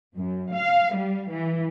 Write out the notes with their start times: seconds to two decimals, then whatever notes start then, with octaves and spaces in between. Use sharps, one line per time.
0.17 F#2
0.53 F5
0.97 G3
1.31 E3